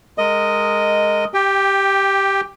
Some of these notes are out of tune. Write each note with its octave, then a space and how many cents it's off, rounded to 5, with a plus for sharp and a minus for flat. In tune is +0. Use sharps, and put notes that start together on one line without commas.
G#3 +0 A#4 -15 D#5 +0
G4 +0 G5 +20